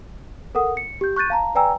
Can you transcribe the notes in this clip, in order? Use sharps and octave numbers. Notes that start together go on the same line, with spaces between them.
A4 A#4 F#5 D#6
C#7
G4 G6
C#6 F#6 G6 A6 D#7
F5 A5 A#5
B4 D5 G5 G#5 A#5 E6